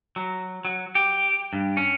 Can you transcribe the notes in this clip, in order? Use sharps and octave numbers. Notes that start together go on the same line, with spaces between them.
F#3
F#3
G4
G2
C#4